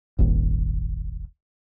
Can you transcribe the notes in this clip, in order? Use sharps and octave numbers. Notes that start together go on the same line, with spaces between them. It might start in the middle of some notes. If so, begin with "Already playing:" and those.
D#1 G#1 D#2